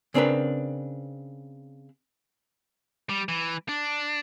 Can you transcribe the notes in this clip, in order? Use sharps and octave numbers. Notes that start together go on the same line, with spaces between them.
C#3 C4 D4 A#4 B4
G3
E3
D4